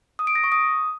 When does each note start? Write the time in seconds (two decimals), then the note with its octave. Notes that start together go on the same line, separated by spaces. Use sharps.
0.19 D#6
0.27 D7
0.35 A#6
0.44 C#6
0.52 D#6